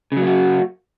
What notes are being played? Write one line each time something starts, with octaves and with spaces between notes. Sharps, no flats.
C#3 F#3 A#3 F#4